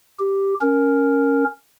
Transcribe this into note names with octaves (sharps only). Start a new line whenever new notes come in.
G4
C#4 A#4